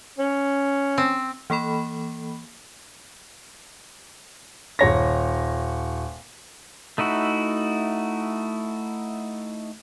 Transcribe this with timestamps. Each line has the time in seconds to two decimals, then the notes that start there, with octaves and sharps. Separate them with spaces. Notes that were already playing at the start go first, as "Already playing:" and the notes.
0.19 C#4
0.98 C4
1.50 E3 A#3 A4 B5
4.79 D#1 C#5 A#6
6.98 A3 D#4 E4 F#4